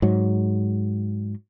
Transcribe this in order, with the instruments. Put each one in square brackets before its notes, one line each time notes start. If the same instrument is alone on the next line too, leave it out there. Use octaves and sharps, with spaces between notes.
[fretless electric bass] G#2 F#3